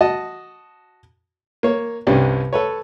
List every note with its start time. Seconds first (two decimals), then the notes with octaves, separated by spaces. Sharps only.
0.01 F#4 D#5 A5
1.63 A#3 C#5
2.07 C2 G2 C3 C#4 D4
2.53 A4 B4 C#5